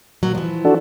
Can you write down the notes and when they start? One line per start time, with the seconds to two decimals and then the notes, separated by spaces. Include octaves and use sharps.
0.23 A#2 F#3
0.35 E3 F3
0.65 D4 F#4 A4